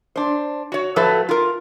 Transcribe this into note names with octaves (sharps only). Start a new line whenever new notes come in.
D4 C5
F#4 C#5
A2 F3 F#3 A3 A4 B4
F4 A#4